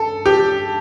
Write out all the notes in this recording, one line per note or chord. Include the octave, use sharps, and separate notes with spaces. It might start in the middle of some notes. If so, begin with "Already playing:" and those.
Already playing: A4
G4